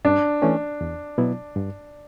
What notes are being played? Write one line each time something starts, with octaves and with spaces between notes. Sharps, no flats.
G2 D4
E3 A3 C#4
E2
B2 F#3 B3 E4
G2